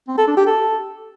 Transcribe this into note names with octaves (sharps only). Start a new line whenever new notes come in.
C4
A4
D4
G4
A4